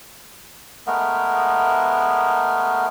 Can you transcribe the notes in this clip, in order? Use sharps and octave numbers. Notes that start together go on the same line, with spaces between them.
G#3 A3 B3 A#4